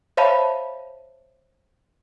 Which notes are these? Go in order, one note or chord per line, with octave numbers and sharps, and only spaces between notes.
C5 C#5 E5 F5 A5 B5